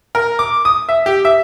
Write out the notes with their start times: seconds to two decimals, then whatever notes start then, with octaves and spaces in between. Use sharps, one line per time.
0.15 A#4
0.39 D6
0.65 D#6
0.89 E5
1.06 G4
1.25 E5